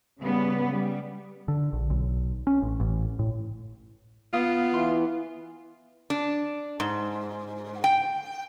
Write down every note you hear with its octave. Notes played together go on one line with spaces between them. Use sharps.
C#3 G3 B3
G3
D3
A#1
B1
C#4
A1
A1
A2
B3 F4 F5 D#6
E3 C6
D4
G#2
G5